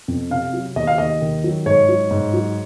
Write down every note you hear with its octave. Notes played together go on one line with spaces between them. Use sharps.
F2
C3 F5
F#3
D#2 D#5
F5
D#2 D#5
D#3
F#3
G#2 C#5
F#3
G#2
F#3